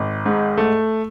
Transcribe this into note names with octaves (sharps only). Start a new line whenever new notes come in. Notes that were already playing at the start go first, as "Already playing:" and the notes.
Already playing: G#1
G#2
A3